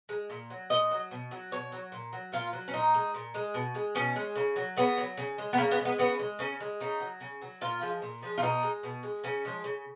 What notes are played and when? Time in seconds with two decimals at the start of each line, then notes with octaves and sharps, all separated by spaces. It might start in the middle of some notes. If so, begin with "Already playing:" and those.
0.09 G#3
0.30 A#2
0.50 F#3
0.70 A#2 D#5
0.91 F#3
1.11 B2
1.31 F#3
1.51 B2 C#5
1.72 F#3
1.92 A#2
2.13 F#3
2.32 A#2 F4
2.53 F#3
2.68 C#4
2.73 A#2 D#4
2.94 G#3
3.14 A#2
3.34 G#3
3.54 B2
3.75 G#3
3.95 B2 C#4
4.16 G#3
4.36 C#3
4.56 F#3
4.77 C#3 B3
4.98 F#3
5.17 C#3
5.38 G#3
5.53 B3
5.58 C#3 A#3
5.71 B3
5.79 G#3
5.85 B3
5.98 C#3 B3
6.19 G#3
6.39 C#3 C#4
6.60 G#3
6.80 C#3 D#4
7.00 F#3
7.20 C#3
7.42 F#3
7.61 A#2 F4
7.81 F3 G#3
8.02 A#2
8.23 F3 G#3
8.38 F4
8.42 B2 D#4
8.63 G#3
8.83 B2
9.03 G#3
9.24 C#3 C#4
9.45 F3 G#3
9.64 C#3